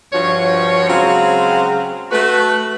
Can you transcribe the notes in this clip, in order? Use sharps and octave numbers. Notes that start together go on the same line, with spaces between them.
G2 F3 F#4 C#5
C#3 F#3 G#3 C4 G#4 F5
A3 F#4 B4